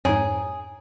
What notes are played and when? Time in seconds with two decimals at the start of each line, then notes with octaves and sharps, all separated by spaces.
0.05 F2 G#2 G#4 C#5 G#5 A#5